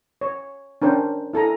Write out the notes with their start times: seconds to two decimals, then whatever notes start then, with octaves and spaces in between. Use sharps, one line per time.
0.21 C#5
0.82 C#4 D4 A#4 C5 G5
1.33 E4 A4 G#5 A#5